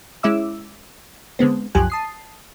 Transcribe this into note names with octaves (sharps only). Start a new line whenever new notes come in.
G#3 C#4 E4 E5 D6 E6
D3 G#3 B3 C4
C2 F#2 F3 G4 G#5 F#6
A5 D#6 C7